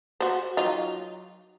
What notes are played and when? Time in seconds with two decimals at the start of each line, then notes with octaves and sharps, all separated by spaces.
0.20 F#4 C5
0.57 F#3 D#4 F4